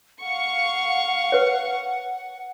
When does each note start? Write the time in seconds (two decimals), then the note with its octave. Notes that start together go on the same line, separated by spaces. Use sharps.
0.22 F5 F#5 C#6
1.32 B4 C#5